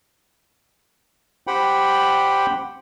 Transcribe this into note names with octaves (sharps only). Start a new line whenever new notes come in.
G4 C5 F#5 G5 B5